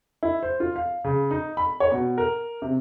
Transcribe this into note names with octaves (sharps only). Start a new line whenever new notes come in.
E4
C5
F4
F5
C#3
D#4
B5
C#5
B2
A#4
C3